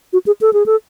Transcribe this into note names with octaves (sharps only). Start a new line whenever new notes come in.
F#4
G#4
A4
G#4
A4